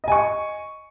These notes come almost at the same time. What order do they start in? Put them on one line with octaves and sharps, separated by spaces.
D#5 G#5 C#6